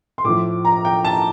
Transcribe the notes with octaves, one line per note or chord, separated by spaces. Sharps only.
C6
A2 F3 D6
A#5
G5
A5